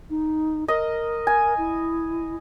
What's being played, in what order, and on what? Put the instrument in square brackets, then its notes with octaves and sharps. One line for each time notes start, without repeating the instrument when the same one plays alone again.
[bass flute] D#4
[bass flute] A#4 [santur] D#5
[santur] G#5
[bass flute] E4